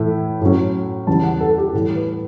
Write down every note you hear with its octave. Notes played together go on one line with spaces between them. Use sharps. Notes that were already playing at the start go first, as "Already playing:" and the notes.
Already playing: A2 E3 A3 E4
A2 F#3 C#4
E2 C#3 E3 G3 A5
F#5
A4
G4
A2 E3 G3 A4
B4